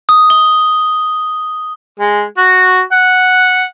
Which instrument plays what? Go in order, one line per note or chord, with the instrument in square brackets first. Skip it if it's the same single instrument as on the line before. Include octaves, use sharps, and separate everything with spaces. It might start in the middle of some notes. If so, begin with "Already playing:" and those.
[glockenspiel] D#6
G7
[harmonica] G#3
F#4
F#5